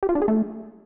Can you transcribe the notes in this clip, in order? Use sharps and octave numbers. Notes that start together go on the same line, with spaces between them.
G4
F4
D4
G#4
A3